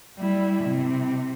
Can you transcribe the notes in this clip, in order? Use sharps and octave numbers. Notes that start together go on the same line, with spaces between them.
G3 E4
C3